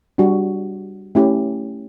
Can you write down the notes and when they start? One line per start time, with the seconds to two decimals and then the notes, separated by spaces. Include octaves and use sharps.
0.18 G3 D4 F#4
1.15 A3 C#4 E4 G4